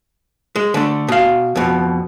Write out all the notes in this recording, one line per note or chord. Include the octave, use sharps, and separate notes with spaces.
G#3
D3 A3
B2 F5
F2 B2